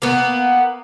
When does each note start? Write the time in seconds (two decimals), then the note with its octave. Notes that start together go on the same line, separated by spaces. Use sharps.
0.02 A#3 B3